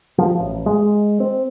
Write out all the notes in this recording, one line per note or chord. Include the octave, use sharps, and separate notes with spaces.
F3
A1
G#3
C4